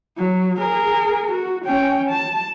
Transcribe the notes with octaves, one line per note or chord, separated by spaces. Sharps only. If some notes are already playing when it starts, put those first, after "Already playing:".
F#3
G#4 A#4
F#4
C#4 G5
A5